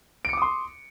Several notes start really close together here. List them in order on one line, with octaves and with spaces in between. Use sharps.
D7 C#7 D6 D#6 C6